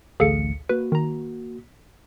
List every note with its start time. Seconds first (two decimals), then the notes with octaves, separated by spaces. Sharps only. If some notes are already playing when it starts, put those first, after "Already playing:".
0.20 A1 D2 G#4 A4 F5 C#7
0.69 A#3 F#4 B4
0.92 D#3 A#5